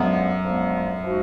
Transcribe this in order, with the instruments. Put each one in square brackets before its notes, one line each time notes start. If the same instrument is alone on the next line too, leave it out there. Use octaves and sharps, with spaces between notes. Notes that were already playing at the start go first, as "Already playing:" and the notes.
Already playing: [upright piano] F#2 [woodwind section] D3 F3 G#3 B3
[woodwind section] D3 F3 G#3 B3
F3 G#3 D#4 F#4